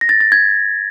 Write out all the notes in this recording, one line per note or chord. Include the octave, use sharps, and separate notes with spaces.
A#6
A6
A6
G#6